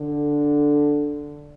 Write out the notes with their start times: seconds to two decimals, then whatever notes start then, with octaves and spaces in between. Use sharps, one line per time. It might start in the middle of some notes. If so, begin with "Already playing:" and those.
Already playing: D3